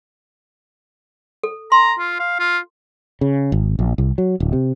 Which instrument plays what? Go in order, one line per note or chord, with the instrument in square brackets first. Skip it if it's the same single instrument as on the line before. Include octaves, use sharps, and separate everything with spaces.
[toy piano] A4
[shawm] A#5 [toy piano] C6
[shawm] F4
F5
F4
[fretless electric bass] C#3
G#1
A#1
C2
F#3
D1
C3